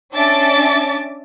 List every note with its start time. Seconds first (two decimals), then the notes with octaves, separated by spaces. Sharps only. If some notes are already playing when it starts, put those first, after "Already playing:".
0.14 C#4 D4 E5 A5 D6 A6